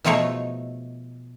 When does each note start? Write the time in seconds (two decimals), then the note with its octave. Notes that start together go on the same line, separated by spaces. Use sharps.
0.04 B2 F3 A3 D#4 G#4 C#5